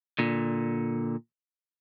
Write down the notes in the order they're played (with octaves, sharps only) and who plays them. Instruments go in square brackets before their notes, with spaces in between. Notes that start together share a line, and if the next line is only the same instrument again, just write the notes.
[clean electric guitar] A#2 D3